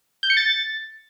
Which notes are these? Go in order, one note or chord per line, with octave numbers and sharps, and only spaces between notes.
G6
C#7
A6